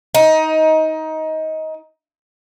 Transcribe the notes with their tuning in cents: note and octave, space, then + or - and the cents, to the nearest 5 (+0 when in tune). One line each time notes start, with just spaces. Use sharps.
D#4 +20